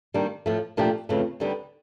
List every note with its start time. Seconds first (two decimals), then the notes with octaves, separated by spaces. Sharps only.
0.14 D#3 G3 A#3 D4
0.46 A2 F3 A3
0.77 A#2 F3 A3 D4 G4
1.09 F2 C#3 E3 A3
1.40 D#2 D3 G3 B3